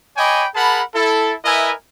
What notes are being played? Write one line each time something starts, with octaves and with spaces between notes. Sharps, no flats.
C#5 D#5 G5 G#5 B5 D6
G#4 A#4 F#5 A5 B5
E4 A4
E4 A#4 B4 D#5 E5 G#5